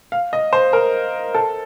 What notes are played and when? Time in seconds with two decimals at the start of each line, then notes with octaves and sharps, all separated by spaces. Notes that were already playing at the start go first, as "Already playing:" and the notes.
0.12 F5
0.33 D#5
0.53 C5
0.73 A#4
1.34 A4